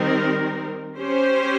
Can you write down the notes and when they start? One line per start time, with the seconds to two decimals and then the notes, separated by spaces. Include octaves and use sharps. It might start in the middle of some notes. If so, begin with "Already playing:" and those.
Already playing: D#3 G3 C4 D#4 A#4
0.98 C#4 G4 C5